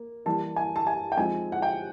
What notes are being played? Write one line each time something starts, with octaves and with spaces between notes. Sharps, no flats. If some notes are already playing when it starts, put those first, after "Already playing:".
Already playing: A#3
E3 G3 A#3 A5
G#5
A5
G#5
G5
F3 G#3 C4 D#4 G#5
F#5
G5